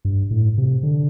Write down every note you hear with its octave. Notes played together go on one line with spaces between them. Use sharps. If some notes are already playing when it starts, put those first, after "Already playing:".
G2
A2
C3
D3